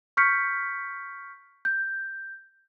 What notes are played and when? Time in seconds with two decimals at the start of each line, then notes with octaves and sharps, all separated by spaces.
0.17 C#6 F6 G6 B6 C#7
1.65 G6